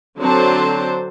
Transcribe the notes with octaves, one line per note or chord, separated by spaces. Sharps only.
D3 F#3 C4 D4 C5 A5